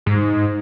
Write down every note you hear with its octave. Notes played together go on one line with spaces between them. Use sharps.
G#2